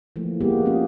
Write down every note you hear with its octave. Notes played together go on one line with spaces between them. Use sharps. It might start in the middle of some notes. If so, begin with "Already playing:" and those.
E3 F3 A3 A#3
G#3 A#3 B3 G4
C4 C#4 F4 G4 G#4